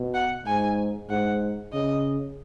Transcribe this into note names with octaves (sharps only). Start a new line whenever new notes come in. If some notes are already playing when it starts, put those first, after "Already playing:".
Already playing: B2
F#5
G#2 G#5
G#2 F#5
C#3 D#5